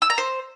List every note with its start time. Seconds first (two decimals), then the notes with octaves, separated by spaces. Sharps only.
0.02 E6
0.10 A#5
0.18 C5